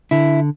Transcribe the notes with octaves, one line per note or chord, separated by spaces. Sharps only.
D3 E4